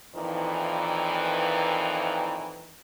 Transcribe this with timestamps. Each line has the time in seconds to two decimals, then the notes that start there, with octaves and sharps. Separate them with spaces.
0.14 F2 A#2 D#3 E3